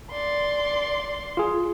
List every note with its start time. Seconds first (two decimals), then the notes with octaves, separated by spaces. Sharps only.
0.11 D5 C6
1.37 F4 G#4